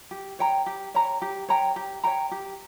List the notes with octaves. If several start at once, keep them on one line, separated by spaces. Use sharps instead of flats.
G4
C#5 G5 A#5
G4
C#5 G5 A#5
G4
C#5 G5 A#5
G4
C#5 G5 A#5
G4